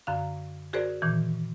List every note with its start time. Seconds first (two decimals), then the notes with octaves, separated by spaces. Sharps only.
0.07 F#2 D3 F5
0.73 F#4 G#4 A#4 C5 D5
1.02 A#2 D#3 E3